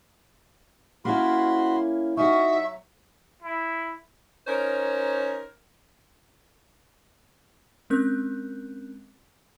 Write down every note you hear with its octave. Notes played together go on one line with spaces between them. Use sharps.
A#3 C#4 E4 F#4 B5 C6
C#4 D#4 F#4 E5 C#6
F#3
E4
C#4 D#4 A#4 C5 C#5
G#3 C4 C#4 A#4 F#6 G6